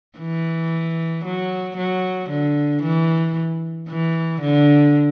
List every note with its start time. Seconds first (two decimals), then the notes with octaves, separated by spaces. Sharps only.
0.18 E3
1.25 F#3
1.77 F#3
2.30 D3
2.82 E3
3.88 E3
4.41 D3